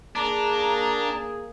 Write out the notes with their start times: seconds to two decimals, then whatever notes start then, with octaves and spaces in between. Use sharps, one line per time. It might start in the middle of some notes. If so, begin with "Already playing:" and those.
0.16 A#3 D4 G#4 A#5